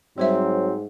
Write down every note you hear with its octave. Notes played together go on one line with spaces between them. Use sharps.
G#2 F#3 G3 C4 C5 E5